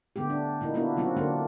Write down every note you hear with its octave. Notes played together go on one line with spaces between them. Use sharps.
D3 A3 B3 G4
D4
A#2 A#3 D#4 E4
A#3 B3 D4 E4 F#4
C#3 F#3 C4 F4 F#4
D3 A3 A#3 C4 D4